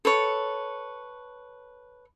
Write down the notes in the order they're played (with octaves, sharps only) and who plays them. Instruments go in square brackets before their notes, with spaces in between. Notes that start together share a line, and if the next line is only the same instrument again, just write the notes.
[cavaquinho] A4 B4 C#5